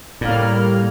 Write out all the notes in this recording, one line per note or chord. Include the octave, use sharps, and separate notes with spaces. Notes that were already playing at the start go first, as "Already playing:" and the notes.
A2 G3 A#3 F6